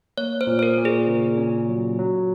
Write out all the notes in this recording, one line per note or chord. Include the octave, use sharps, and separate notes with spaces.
A#3 C#5
C5
A#2
C5
A#4
A#2
G#4
C#3
C#4
F#3
F#3